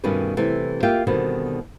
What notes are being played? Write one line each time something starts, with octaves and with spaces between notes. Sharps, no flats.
G2 B2 D#3 A3 C#4 B4
C3 E3 A3
A#3 F4 G4 E5 G5
B2 D3 D#3 G3 B3 C4